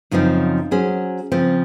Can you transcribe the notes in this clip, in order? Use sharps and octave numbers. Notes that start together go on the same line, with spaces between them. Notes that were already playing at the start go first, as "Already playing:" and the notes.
F#2 C#3 F3 C4 D#4
F#3 C#4 G#4 C5
C#3 F3 C4